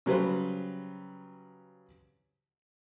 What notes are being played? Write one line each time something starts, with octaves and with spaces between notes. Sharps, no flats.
C#3 F#3 G3 B4 C5